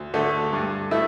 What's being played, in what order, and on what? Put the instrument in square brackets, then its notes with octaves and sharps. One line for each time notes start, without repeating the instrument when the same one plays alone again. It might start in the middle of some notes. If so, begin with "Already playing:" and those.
Already playing: [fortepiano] D2
D3 A3
G2
A3 E4